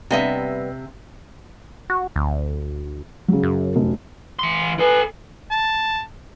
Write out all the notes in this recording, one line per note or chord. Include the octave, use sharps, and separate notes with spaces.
C3 G3 B3 D#5 E5
F#4
D2
C#3 F#3
F#2
F1
E3 C6
A4 B4 G#5
A5